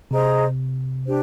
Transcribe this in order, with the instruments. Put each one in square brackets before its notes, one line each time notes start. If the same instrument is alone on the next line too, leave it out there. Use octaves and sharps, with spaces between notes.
[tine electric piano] C3 [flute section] G#4 C5 D#5 A#5
[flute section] D4 G4 C5